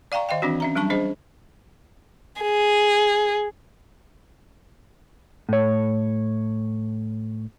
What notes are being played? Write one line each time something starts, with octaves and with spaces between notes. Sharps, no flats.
D5 F5 G5 A#5 C#6
D#3 D#5 F5 G5
E3 C4 D4 F#4
C#4 E5 A#5
F#3 G3 D4 A5 C#6
D4 G#4 C5 D#5
G#4
A2 C#5